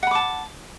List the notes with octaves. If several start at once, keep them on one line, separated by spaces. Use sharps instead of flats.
F#5 A5 B5 D6